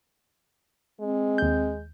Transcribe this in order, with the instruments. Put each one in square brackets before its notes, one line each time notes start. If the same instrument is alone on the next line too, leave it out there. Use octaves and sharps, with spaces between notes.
[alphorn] G#3 [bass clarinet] C4
[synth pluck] D#2 G6